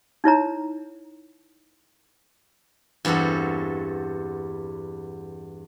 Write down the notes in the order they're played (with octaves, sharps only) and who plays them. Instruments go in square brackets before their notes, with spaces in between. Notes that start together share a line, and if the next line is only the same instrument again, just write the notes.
[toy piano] D#4 E4 C#5 A#5
[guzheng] E2 G2 C4 F#4 A4